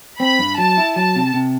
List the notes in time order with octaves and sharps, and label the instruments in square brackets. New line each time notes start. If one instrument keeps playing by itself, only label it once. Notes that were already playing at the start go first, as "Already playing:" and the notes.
[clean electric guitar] C4 [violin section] B5
[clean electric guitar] G2
[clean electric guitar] F#3 [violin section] A5
[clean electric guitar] E4
[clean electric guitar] F#3 [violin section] A5
[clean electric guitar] C3
C3